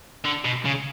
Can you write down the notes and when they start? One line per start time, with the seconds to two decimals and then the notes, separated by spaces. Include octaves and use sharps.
0.25 D3
0.45 B2
0.65 C#3